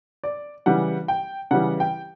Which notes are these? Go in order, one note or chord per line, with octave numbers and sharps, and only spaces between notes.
D5
C#3 E3 G3 F#5
G5
C#3 E3 G3 F#5
G5